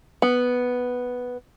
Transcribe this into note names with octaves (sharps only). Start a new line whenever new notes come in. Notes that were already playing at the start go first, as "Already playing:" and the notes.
B3